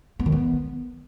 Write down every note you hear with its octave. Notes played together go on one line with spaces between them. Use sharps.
B3
D#3
B3